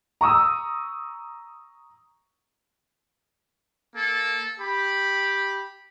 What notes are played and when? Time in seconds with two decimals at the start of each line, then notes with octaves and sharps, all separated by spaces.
0.21 A#5 C#6 D#6 E6
3.95 A#3 A4
4.60 G4 B5